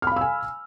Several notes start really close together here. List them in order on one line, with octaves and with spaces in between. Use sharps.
F6 B5 F5 E6 G#5